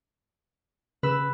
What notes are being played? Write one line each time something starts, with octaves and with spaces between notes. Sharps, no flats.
C#3 B4 E6